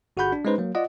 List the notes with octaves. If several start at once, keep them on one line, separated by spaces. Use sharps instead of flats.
G1 F#4 G#4 F#5 B5 G6
D4
G#3 C#4 D#4 B4 C5
F#3 A#3
F4 D5 D#5 F#5